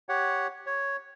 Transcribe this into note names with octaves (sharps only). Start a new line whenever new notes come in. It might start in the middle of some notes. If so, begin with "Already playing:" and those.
G4 C#5 F#5
C#5